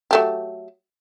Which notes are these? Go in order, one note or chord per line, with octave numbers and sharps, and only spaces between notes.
F#3 A3 G4